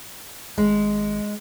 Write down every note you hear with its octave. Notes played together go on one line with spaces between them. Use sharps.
G#1 G#3